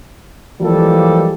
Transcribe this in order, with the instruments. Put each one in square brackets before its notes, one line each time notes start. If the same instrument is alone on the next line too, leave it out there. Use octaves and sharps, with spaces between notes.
[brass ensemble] E3 F3 G3 G#3 A#3 A4